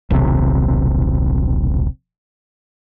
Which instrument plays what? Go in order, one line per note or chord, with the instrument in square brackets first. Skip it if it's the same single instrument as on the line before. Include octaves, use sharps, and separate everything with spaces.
[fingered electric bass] D#1 B1 C3